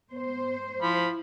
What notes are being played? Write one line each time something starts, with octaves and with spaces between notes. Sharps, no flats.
B3 C5
F3 E4 B5